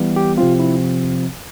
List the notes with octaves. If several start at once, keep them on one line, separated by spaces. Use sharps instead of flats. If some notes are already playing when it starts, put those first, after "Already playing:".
Already playing: E3 G3 B3
G4
C3 F3 C4 F4
E4